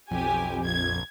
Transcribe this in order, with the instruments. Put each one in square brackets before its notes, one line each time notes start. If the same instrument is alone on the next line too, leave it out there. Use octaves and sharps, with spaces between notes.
[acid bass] B1 [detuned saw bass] F2 [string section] G4 G#5
[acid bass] A#1 [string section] G#6